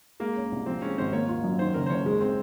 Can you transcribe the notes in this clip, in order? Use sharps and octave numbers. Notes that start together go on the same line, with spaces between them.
G#3 A#3
C#4
C2
F3 C4
G#3 C#4
G#1 C5
A#3 C#5
F4
F#2
D#3 C5
F#1 A#4
C5
F#1 C#5
G#3
C4